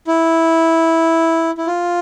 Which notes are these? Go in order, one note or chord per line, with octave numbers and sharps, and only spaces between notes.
E4
E4
F4